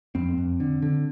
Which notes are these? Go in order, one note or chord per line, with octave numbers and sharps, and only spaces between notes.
F2 C4
F2
D3
D3